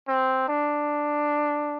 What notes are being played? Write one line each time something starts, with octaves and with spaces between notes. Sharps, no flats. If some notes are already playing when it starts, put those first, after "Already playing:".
C4
D4